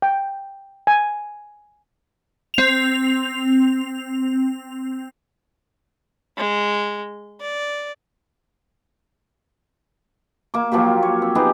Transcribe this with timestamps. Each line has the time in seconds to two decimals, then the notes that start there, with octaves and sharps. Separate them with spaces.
0.02 G5
0.87 G#5
2.54 C4 F7
6.38 G#3
7.41 D5
10.54 A#3 D6
10.72 F3 F#3 A#3 G4
11.03 C#5
11.22 C4
11.35 B3 D#4 G4 G#4